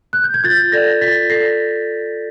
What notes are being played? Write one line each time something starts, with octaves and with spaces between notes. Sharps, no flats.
F#6
G6
G#6
F4 G6 A6
A6
A4 D5 G#6 A#6
F4 A6 B6
A4 D5 A#6 C7